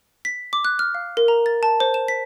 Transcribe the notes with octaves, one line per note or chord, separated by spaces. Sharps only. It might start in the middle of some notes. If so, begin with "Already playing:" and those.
B6
D6
F#6
F6
F5
A#4
A#5
A6
A5
C5
E7
B6